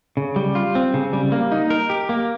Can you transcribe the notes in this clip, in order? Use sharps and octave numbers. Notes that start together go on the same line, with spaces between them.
C#3
G3
F4
C4
C#3
G3
A#3
D#4
A#4
G4
A#3